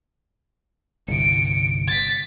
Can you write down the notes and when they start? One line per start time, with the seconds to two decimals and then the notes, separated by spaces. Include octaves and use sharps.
1.08 G1 C2 C#7 D7
1.88 A6 B6